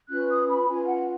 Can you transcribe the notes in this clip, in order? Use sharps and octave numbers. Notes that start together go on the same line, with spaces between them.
C#4 F4 B4 F#6
D#6
B5
C#4 F4 B4 G#5
F#5